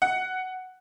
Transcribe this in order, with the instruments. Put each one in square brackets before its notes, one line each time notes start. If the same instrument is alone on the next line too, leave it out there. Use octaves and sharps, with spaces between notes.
[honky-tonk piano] F#5